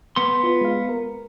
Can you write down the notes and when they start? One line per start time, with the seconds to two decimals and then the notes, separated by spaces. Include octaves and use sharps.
0.16 B3 C6
0.43 F4 B4
0.61 G#3 F5
0.89 A#4